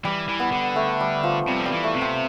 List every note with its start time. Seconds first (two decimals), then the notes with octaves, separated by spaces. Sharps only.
0.05 E3 G3
0.28 E3
0.40 B3
0.52 D3
0.76 A3
1.00 G3
1.23 F3
1.48 C3 G3
1.60 F3
1.66 G3
1.72 E3
1.84 A3
1.95 C3
2.02 C4